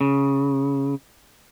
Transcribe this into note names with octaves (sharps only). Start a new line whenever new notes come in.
C#3